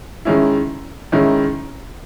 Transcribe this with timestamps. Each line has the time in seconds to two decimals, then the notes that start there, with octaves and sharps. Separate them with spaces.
0.25 D#3 G#3 C#4 E4
1.12 D#3 G#3 C#4 E4